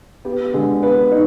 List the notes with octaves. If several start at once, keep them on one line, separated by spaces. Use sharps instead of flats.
B3 G4
G4
D3 G#3 G#4
B3 B4
D#4